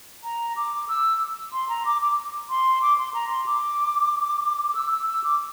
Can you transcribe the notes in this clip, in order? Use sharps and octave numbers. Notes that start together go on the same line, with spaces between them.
A#5
D6
E6
C6
A#5
D6
D6
C6
D6
C6
A#5
C6
D6
D6
E6
E6
E6
D6